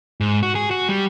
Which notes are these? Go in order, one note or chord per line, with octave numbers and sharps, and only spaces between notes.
G#2
F#4
G#4
F#4
G3